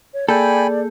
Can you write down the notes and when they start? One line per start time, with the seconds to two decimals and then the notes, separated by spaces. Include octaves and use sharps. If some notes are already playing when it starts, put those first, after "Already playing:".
0.14 C#5
0.29 A#3 G#4 A4 D5 G5 G#5 B5 G6